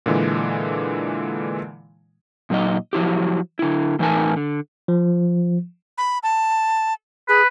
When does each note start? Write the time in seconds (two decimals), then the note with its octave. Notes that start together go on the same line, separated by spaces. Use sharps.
0.06 A#2 D3 E3 G#3
2.50 A#2 F#3 D#4 D#5
2.93 F3 F#3 E4 G4
3.59 D3 E4
3.99 A2 E3 D#4 A#4 G#5 A5
4.36 D3
4.88 F3
5.98 B5
6.23 A5
7.29 G#4 B4